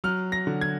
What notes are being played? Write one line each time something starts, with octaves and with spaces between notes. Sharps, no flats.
F#3 F6
A#6
D3
G#6